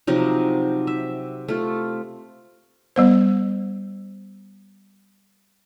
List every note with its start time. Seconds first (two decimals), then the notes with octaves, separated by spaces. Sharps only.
0.07 C3 F3 F#3 D#4
0.87 E5
1.48 A3 F4
2.96 G3 B3 C5